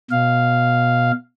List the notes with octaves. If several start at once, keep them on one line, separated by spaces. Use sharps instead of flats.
B2 F5